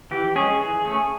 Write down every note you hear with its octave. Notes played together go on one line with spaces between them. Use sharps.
E3 G4
G#3 C#4 G#4
E3 G#4
A3 C#4